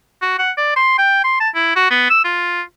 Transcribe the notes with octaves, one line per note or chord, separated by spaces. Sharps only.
F#4
F#5
D5
C6
G5
C6
A5
E4
F#4
B3
E6
F4